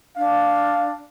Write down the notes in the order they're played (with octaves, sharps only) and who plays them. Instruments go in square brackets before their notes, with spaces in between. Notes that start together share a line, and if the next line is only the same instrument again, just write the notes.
[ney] D4 [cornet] F5